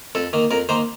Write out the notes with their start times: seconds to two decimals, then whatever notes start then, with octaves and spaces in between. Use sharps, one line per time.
0.15 F2 A4
0.33 D#3 A#3
0.51 F2 A#4
0.69 D#3 A#3 C5